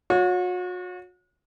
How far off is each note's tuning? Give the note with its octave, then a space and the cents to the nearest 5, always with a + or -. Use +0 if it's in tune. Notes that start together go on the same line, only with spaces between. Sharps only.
F#4 -40 C#5 +10